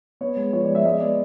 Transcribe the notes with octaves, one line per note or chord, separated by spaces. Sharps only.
B3 C#5
G#3
F3 C#5
D5
G#3
E5
G#3 D#5
B3 D5